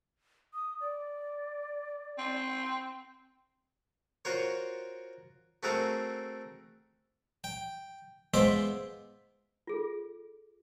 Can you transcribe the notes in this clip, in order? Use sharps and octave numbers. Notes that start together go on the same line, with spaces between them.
D#6
D5
C4
F4 F#4 A#4 C5 C#5
A3 C4 F#4 G#4 A#4 F5
G5
G#3 B3 F4 C5 E5 D6
F4 G#4 A4